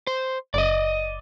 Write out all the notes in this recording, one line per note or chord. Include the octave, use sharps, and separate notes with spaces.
C5
F#1 D5 D#5